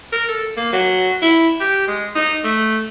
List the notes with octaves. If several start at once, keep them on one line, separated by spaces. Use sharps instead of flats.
A#4
A4
A#3
F#3
E4
G4
G#3
D#4
A3